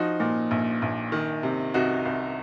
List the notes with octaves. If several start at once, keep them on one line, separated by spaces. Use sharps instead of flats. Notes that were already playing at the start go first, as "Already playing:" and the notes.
Already playing: F3 D#4 F#4
A#2
A#1
A#1
D#3
C3
C2 D#4 F#4
C2